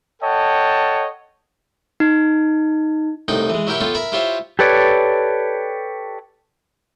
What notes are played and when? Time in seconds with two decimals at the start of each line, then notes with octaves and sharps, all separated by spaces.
0.22 A4 C#5 D#5 F#5 G5 A5
2.00 D#4
3.28 C2 A2 D#4 F#5 G5 D#6
3.50 E3 G#3
3.67 F#3 E4 G4 A#4 G5 C#6
3.81 B3 F4 A4 C#5 G5
3.95 A#4 E5 A#5 B5
4.12 E4 F4 G4 C5 C#5 E5
4.59 G4 A4 B4 C#5 D5